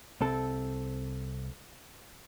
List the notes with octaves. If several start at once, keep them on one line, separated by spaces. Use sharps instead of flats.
C2 C4 A4